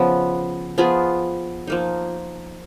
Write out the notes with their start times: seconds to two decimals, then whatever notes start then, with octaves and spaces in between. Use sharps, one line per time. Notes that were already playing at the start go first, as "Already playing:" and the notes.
Already playing: C#3 F3 B3
0.78 F3 B3 F4 G#4
1.67 F3 A#3 D#4